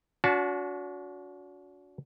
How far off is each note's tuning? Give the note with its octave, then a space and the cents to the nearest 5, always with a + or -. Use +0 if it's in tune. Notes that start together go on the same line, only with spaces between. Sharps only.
D4 -45 F#4 -20 A5 -20